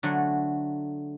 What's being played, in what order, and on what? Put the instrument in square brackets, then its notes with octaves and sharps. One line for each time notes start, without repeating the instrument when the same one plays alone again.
[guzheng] D3 F#3 A3